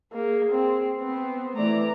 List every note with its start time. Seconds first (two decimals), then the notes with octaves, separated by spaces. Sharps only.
0.13 A#3 G#4
0.52 C4
1.01 B3 C4
1.57 E3 A3 D5 A#5